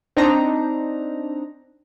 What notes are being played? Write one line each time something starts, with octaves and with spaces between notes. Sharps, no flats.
C4 D4 D#4 A#5